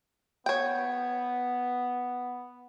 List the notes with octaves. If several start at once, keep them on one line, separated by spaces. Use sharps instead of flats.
B3 C#5 G5